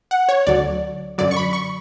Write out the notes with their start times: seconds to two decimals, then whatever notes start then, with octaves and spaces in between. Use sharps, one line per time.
0.11 F#5
0.29 C#5
0.47 D2 D3 F#3 D5
1.18 F#2 D3 F#3 D5
1.31 C#6
1.36 B5
1.53 C#6